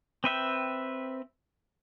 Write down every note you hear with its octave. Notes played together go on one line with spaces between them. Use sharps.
C4 B4 E5 G5